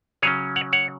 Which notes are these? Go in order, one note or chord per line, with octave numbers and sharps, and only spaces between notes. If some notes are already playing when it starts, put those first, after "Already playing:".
C#3 F#3 C#4 G#4 C#5
C#5 F#5
C#5 F#5